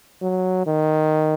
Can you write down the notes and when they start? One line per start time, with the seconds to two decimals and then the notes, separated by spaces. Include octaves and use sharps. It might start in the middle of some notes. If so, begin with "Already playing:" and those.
0.22 F#3
0.66 D#3